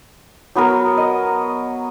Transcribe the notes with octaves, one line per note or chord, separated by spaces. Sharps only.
F#3 B3 F#4 A#4
D#5